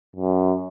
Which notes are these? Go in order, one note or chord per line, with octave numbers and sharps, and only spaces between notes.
F#2